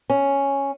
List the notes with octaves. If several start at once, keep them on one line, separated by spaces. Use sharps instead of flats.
C#4